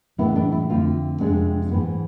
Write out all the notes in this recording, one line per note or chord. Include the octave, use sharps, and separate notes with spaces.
A2 E3 G#3 B3 E4
D4
E4
F2 D3 A3 C4 F4
F2 C3 G#3 B3 D4
G#2 E3 B3